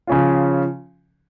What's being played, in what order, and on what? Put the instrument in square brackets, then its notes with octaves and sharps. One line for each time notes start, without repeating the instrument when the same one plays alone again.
[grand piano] C#3 F3 C#4 F4